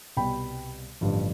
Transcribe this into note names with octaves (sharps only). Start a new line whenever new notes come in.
C2 B2 G3 G5 B5
A1 G2 D3 F3